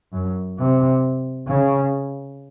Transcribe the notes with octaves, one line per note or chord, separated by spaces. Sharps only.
F#2
C3
C#3